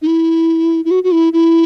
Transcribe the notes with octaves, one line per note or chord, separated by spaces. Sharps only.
D#4
E4
E4
F#4
F#4
E4
E4